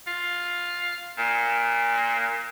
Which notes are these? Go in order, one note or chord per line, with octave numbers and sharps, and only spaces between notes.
F4
A#2